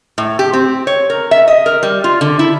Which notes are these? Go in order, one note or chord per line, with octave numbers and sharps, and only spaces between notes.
A2
G4
C4
C#5
A#4
E5
D#5
A#4
G3
F4
D3
E4